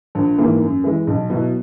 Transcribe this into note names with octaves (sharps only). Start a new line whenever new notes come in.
A#1
G#2 E3 A#3
F#2
E3 G#3
B1
B2 F#3 B3 E4